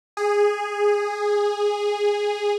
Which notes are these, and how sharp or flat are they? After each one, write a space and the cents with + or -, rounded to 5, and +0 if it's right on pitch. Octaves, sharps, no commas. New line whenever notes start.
G#4 -10